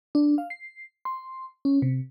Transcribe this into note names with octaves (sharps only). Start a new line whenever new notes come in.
D4
F5
C7
C6
C#4
C3